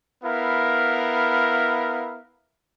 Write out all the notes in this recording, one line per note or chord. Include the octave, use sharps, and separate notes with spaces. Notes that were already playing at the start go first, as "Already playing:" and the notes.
B3 E4 A#4 F5